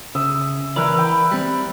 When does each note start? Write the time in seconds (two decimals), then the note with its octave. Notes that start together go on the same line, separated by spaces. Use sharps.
0.15 C#3 E5 D#6
0.76 E3 E4 A#4 B4 C#5 D5
0.98 G5
1.32 G3 C4